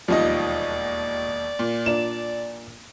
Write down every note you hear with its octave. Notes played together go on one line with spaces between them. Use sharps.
E1 D#2 F3 G3 D#4 D5 D#5
A#2
A#2 D4 E7